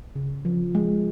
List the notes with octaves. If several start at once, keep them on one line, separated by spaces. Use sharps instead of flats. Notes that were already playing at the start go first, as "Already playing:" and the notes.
C#3
F3
G#3